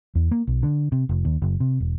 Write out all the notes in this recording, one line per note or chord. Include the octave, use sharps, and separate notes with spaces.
E2
A#3
B1
D3
C3
F1
D#2
F#1
C3
E1